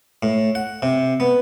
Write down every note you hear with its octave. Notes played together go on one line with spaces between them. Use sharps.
A2
F#5
C3
B3